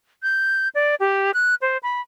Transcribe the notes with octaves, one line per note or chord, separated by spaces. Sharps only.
G6
D5
G4
F#6
C5
B5